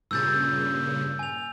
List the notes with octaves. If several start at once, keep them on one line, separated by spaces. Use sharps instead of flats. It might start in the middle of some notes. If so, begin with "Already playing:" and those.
G2 A#2 C#3 E6 G6 A6
G#5 F7